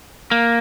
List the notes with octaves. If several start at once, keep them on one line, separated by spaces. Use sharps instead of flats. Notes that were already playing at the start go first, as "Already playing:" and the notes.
A#3